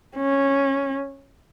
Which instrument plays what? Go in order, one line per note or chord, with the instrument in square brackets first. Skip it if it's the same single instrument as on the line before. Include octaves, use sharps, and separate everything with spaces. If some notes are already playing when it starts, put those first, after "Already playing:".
[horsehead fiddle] C#4